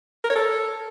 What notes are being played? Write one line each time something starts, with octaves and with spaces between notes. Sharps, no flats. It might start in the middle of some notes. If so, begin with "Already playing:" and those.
A#4
C#5
A4